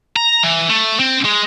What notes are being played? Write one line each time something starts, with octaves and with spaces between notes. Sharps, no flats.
A#5
E3
A3
C4
G#3